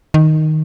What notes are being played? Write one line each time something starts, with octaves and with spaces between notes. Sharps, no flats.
D#3